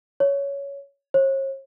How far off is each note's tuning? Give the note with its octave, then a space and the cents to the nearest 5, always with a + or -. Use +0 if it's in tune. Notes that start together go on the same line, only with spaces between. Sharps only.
C#5 +10
C#5 -45